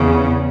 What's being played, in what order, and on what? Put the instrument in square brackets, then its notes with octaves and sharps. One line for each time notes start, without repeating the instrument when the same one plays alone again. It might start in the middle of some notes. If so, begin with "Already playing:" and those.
Already playing: [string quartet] E2 C#3